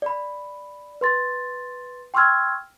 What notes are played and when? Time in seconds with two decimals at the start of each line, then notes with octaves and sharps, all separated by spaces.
0.02 D5 B5
1.01 B4 C6 A6
2.14 G5 C6 C#6 E6 F6 G#6